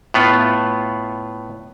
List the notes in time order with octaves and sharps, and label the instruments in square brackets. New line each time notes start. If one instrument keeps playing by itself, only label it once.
[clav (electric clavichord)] A2 B3 F4